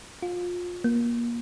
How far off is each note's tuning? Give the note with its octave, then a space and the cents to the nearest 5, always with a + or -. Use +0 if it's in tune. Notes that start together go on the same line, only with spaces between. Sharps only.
F4 +25
A#3 +25